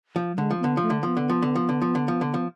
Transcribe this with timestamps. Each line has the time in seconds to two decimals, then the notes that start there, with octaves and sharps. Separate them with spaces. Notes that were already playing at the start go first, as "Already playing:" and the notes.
0.16 F3
0.33 F#3
0.38 D3 G#3
0.51 F3
0.60 D3 B3
0.77 F3 A3
0.90 D3
1.03 F3 B3
1.17 D3
1.29 F3
1.42 D3
1.55 F3
1.69 D3
1.82 F3
1.95 D3
2.08 F3
2.21 D3
2.34 F3